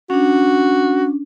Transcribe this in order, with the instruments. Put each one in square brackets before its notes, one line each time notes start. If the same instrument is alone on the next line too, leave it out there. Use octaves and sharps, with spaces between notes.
[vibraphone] C#4 D4 [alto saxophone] F#4